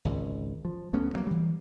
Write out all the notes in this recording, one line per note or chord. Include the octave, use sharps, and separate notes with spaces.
G#1 C#2
F3
D2 A3 B3 C#4
G2 F#3 A#3
E3 G3